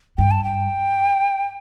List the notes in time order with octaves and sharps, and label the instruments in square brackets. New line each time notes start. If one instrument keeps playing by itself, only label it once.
[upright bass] G2 [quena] G5
[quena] A5
G5